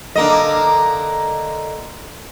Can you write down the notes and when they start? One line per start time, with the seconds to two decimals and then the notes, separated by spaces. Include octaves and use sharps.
0.16 D3 A#3 D#5